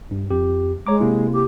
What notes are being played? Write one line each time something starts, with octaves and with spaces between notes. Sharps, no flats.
G2
F2 G4
G#3 C#5 A#5 D6
C3 A#3 E4
G4